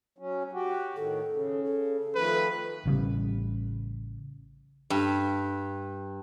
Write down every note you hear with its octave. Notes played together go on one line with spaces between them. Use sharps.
F#3 C#4
F#4 G4
A2 D#3 A4
C#3
A4
D#3 F3 A3 B4
A1 C#3 G3
G2